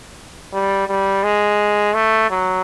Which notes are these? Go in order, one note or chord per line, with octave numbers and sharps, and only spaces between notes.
G3
G3
G#3
A3
F#3